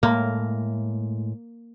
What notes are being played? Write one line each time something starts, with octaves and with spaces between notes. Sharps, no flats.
A2 G#3 A#3